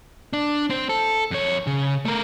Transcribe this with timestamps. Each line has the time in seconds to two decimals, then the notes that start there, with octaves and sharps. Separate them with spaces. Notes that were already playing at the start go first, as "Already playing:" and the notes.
0.33 D4
0.70 C4 C5
0.89 A4
1.31 F2 C#5
1.67 C#3
2.05 A3 A#4